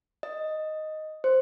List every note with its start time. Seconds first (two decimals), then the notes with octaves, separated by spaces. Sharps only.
0.23 D#5
1.24 C5